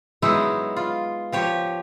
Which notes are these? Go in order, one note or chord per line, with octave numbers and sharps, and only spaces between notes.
F#3 G#3 B3 D#4 E4
F4
F3 G4 C#5